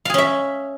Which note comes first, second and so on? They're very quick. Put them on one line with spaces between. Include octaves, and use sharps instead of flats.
F5 G#4 C#4 E5